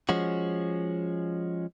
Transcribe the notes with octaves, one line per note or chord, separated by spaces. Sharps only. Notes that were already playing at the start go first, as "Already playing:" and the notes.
F3 G#3 C#4 F#4